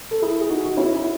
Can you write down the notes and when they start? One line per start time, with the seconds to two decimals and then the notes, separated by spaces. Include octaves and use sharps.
0.11 A4
0.22 E4 G#4
0.41 G#4
0.50 D#4 F#4
0.65 F#4
0.77 C#4 E4
0.96 E4